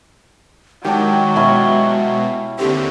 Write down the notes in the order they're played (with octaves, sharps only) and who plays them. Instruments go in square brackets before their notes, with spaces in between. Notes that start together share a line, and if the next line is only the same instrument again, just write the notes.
[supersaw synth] D#3 [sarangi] F#3 [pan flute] G#3 [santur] D4 G4
[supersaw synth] B2 [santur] C#4 E4 A5
[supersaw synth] D#2 D3 C4 [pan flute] G4